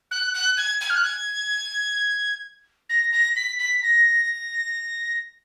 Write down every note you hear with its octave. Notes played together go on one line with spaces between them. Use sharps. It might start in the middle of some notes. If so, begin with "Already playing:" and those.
F#6
F#6
G#6
G#6
F6
F#6
G#6
A#6
A#6
B6
B6
A#6